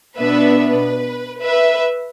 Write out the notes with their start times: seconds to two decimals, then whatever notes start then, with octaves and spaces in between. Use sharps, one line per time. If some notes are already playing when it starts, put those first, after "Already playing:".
0.18 B2 B3 D4 B4 E5
0.59 B4
1.41 B4 E5